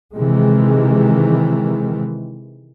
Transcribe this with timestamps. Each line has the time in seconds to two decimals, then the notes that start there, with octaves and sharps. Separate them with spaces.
0.15 C3 D#3 E3 G#3